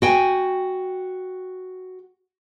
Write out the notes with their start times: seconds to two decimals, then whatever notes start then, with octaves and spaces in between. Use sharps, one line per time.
0.02 F#4 G5 G#5